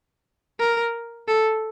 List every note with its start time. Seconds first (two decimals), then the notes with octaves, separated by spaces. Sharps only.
0.60 A#4
1.28 A4